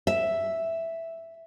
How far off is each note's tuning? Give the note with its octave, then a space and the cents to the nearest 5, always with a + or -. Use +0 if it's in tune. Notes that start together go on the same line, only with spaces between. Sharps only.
E5 +0